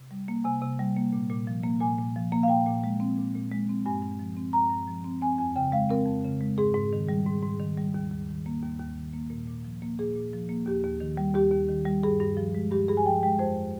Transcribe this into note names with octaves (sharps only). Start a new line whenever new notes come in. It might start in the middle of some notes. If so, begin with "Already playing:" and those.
Already playing: C3
G3
A#3
C3 G#5
C3
G3
A#3
A#2
A#2
F3
A#3
A#2 G#5
A#2
F3
A#3
F5
A#2 G5
A#2
G#3
C4
A#2
A#2
G#3
C4
G2 G#5
G2
F3
C4
G2 A#5
G2
F3
C4
C4 G#5
F2 G#5
C#3 G5
G#3 F5
C4 A#4
F2
C#3
G#3
G#2 G#4
G#2
D#3
G3
G#2
G#2
D#3
G3
D#2
D#2
D#3
A#3
D#2
D#2
D#3
A#3
A#2
A#2
F3
A#3
A#2 G#4
A#2
F3
A#3
D#2 G4
D#2
D#3
G3
D#2 G4
D#2
D#3
G3
G2 G#4
G2
F3
G#3
G2 G4
G2 G#4
G#5
F3 G5
G#3 G5
F2 C5